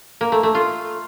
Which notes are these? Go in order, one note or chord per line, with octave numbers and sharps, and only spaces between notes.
A#3
A3
A3
F4